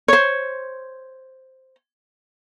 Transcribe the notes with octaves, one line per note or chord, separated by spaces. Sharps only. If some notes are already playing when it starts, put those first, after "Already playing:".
C5 C#5